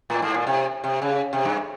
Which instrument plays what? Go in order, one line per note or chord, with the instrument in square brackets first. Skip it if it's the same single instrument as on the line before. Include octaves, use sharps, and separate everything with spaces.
[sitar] A2
G#2
A#2
C3
C3
C#3
C3
G2